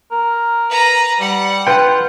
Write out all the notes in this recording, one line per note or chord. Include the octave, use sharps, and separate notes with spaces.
A#4
B4 A#5
G3 F#5
F4 B4 G5